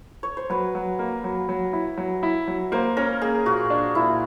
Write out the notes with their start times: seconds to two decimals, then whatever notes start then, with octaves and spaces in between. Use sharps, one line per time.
0.23 C#5
0.37 C5
0.50 F#3 B4
0.75 F#3
0.99 A#3
1.24 F#3
1.49 F#3
1.73 E4
1.98 F#3
2.23 E4
2.48 F#3
2.72 A#3 C5
2.97 C#4 A#4
3.22 A#3 G#4
3.46 A#2 F#4
3.70 D4
3.95 A#2 E4